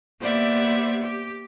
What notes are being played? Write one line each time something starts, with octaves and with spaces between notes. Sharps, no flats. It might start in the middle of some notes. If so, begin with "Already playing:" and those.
A#3 B3 G4 C5 D5 E5
G4